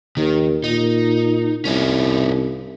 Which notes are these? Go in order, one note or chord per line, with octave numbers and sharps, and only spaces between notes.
D#2 D#3
A#2 D#4
C2 C#4 D#4 E4